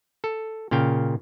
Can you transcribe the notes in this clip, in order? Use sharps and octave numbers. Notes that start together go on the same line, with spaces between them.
A4
A#2 C#3 F5 G5